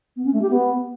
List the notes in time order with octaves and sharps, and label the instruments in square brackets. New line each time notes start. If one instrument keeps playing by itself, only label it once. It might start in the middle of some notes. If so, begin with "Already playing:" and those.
[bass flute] B3
C#4
A3
G4
B3